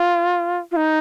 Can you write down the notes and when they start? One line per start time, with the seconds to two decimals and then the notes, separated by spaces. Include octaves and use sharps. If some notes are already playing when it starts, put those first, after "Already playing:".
Already playing: F4
0.71 F4
0.76 D#4